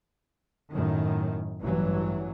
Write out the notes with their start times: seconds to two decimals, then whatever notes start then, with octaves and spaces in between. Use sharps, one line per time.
0.71 F#2 A2 D#3
1.60 A1 G2 E3 F#3